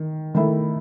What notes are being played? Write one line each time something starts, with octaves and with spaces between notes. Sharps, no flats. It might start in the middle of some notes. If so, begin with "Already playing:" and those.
Already playing: D#3
D#3 A3 E4